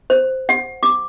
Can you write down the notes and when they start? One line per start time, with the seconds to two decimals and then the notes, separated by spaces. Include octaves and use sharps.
0.10 C5
0.49 F#5
0.83 D6